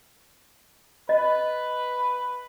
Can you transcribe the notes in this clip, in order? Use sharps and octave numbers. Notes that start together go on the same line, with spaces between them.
B4 D#5